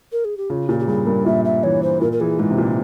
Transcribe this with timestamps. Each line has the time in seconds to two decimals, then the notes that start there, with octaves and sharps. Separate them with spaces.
0.12 A#4
0.25 G#4
0.37 G4
0.50 C#3 F4
0.69 A#2 G4
0.80 G4
0.88 G2 G#4
1.06 G2 A#4
1.26 A#2 E5
1.45 E5
1.63 E3 C#5
1.83 C5
2.01 A#2 A#4
2.12 A#4
2.20 E3 G#4
2.39 G#2 F4
2.50 C3
2.58 A#2 E4